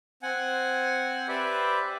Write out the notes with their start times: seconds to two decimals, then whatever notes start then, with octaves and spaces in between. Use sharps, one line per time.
0.23 C4 F#5 G#5
1.28 G4 B4 C5 D5 E5